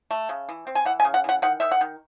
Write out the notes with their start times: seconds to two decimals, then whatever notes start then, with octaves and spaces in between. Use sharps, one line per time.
0.11 A3
0.29 C#3
0.49 E3
0.67 C4
0.75 G#5
0.85 E3 F#5
1.00 G#5
1.05 C#3
1.14 F#5
1.24 E3 F#5
1.42 D#3 F#5
1.60 D#3 E5
1.71 F#5
1.81 D#3